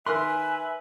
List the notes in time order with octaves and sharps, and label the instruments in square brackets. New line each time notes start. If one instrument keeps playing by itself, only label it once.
[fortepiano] D#3 A#4 C6 [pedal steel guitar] B4 [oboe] E5 [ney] G#5